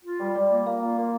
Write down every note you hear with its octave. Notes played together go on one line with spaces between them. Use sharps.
F4
G3
G3 D5
A#3
A#3 F5
F4
A#3